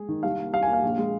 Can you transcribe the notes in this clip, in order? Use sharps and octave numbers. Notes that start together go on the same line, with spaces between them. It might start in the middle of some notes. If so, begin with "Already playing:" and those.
Already playing: G#3 G#4
D#3
C2 F5
A#3
C2 F5
G#5
A#3 F5
A#1
G#3